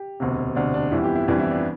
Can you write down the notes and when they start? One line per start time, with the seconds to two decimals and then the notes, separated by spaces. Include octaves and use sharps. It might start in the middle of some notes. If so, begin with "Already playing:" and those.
Already playing: G4
0.20 E1 D2 C3
0.55 E1 D2 C3 D4
0.74 D4
0.91 G1 F2 E3 G3 E4
1.03 G4
1.15 E4
1.27 G1 F2 E3 G3 D4
1.39 E4
1.51 D4